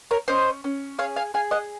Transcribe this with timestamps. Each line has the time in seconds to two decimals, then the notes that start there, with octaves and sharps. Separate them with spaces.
0.11 A#4 C#5
0.28 C#4 C5 D#5
0.64 C#4
0.98 G#4 C#5 F5
1.16 F5 G#5
1.34 G#4 F5 G#5
1.51 D#5 F#5